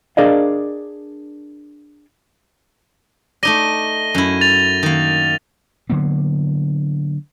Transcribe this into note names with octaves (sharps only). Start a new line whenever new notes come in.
D4 G#4 A#4 D5 D#5 F5
A3 D#4 D5 A#6 D#7 G7
F#2 E4
A6 F7
D#3 A#3
D3 F#3 A#3 B3